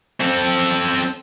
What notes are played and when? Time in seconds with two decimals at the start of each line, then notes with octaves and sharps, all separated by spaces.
0.21 C4 A4